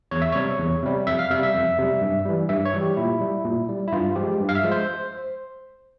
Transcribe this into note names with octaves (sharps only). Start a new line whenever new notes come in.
E2 C#5
E5
C3 G3 C#5
E2
C3 G3
F2 E5
F5
C3 G3 E5
E5
F2
C3 G3
G2
E3 G3
G2 E5
C#5
E3 G3
G4
A#2 E4
G3
A#2
G3
E4
G2 F4
F3 G#3 G4
G2
F5
E5
F3 G#3
C5